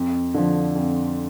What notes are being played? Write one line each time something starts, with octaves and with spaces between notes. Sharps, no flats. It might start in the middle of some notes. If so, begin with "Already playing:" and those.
Already playing: F2
D3 F3
F2